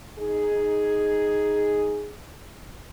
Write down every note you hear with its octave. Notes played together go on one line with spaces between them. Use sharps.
D#4 G#4